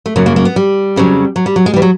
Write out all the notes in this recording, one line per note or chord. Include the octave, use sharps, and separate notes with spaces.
A3
F#2 C#3 F#3 A#3
A#3
A#3
B3
G3
F2 C#3 F#3
F#3
G3
F#3
G#3
E3 G3
F#3